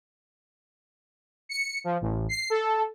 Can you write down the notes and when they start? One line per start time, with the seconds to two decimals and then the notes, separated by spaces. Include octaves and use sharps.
1.49 C#7
1.84 F3
2.01 A1
2.29 C7
2.50 A4